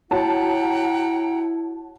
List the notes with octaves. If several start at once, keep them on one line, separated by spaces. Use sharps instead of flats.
E4 F#4 C#5 F#5 G5 A5 A#5